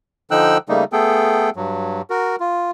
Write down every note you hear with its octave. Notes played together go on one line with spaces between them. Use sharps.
D3 F3 D#4 G5 E6 F#6
C#3 G3 A3 A#3 D#4
A3 B3 G#4 A4 G5
G2 F#3
F#4 A#4
F4